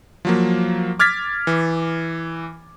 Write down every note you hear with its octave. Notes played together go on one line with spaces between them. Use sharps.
F3 F#3 A#3
D6 F6 G#6 A6 B6
E3